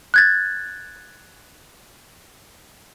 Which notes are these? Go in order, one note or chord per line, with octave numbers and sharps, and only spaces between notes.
F#6 G#6 A6